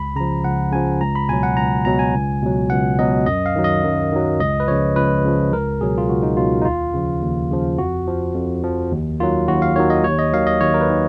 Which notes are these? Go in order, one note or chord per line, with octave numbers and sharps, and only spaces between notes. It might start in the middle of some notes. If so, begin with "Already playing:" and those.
Already playing: C#2 B5
C#3 F3 A#5
C#2 F#5
C#3 F3 G#5
C#2 A#5
B5
B2 F#3 G#5
F#5
C#2 A#5
B2 F#3 A#5
G#5
C#2
B2 F#3
C#2 F#5
B2 F#3 D#5
F#2 D#5
F5
D#3 F#3
D#5
F#2
D#3 F#3
C#2 D#5
B4
C#3 F3 C#5
C#2 B4
C#3 F3
C#2 A#4
B2 F#3 G#4
F4
C#2 F#4
D#4
B2 F#3 F4
D#4
D#2 F4
C#3 F3
D#2
C#3 F3
F2 F#4
F3
F2
F3
D#2
D#3 F#3 F4
D#2 F#4
F5
D#3 F#3 C#5
D#5
D#2 C#5
D#5
D#3 F#3 F5
D#5
D#2 C#5
A#4
B4
D#3